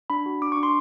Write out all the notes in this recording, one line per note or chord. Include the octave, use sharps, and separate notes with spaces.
D4 B5
F#4
D4 D6
C#6
D4
C6